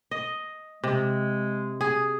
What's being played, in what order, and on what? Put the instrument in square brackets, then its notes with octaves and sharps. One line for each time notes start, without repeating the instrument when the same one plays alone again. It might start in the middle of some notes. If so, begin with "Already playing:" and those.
[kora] D#5
[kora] C3 [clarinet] G#3
[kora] G#4